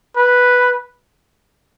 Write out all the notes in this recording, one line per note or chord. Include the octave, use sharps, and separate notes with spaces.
B4